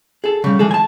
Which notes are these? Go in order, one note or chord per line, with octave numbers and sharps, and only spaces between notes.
G#4 A4
C#3 G3
E3 G#3 G#4 A4
G#5 A5